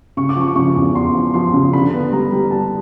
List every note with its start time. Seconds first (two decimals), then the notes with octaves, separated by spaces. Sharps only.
0.17 C#3 C#6
0.29 D6
0.36 F3
0.41 C#6
0.56 C#3 C#6
0.76 E2
0.95 E2 C6
1.14 F3
1.34 F3 C6
1.54 C#3
1.73 D3 B5
1.93 B3
2.12 G3 A#5
2.32 G3
2.51 G3 A5